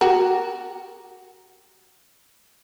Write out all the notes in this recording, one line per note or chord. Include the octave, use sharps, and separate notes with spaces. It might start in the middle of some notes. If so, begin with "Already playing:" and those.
F#4 G4 A#4